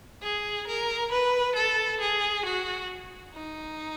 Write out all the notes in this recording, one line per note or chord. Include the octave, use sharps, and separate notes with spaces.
G#4
A#4
B4
A4
G#4
F#4
D#4